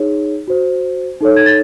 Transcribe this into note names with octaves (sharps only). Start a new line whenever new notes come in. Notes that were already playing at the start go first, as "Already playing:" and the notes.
Already playing: D#4 G#4 C#5
F#4 C5
D#4 A4 C#5
G#6
A6